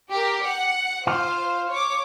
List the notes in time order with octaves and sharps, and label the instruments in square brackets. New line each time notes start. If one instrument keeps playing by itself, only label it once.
[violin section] G4 A#4
F#5
[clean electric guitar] F4 [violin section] C5 F5
[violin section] C#5 D6